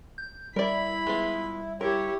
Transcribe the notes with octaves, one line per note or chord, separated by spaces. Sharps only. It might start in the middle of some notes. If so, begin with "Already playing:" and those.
G6
G3 E4 A#4 D5 B5
G#3 B3 F4
E4 G4 A#4 C#5